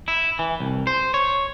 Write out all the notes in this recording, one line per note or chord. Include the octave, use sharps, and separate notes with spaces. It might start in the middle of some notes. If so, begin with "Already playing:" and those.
E4
E3
C2
C5
C#5